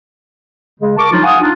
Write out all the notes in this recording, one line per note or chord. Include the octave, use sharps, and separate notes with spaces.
C#3 G#3
A#4 A5 C#6 D6
F3 F#3 D4 D#4 F4
F5 F#5 G#5 D#6
D4 D#4 F4